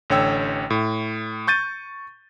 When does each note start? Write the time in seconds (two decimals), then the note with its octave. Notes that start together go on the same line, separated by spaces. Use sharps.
0.10 A1 D3 C#5 G5 E6
0.70 A2
1.48 C#6 G6 A6 D#7